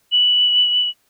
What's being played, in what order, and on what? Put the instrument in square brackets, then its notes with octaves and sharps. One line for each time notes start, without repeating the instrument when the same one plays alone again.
[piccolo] F#7